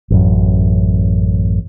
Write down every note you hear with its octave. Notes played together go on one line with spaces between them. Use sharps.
A1 F#2